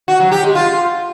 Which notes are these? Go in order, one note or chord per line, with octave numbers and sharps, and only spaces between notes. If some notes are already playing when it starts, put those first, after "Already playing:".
F#4
F#3
G4
G#3
F4